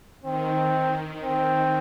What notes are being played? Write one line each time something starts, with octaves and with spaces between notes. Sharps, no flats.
D#3 C4
D#3 C4